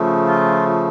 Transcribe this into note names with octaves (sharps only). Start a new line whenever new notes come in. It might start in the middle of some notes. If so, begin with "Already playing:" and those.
Already playing: C#3 F3 A3
F4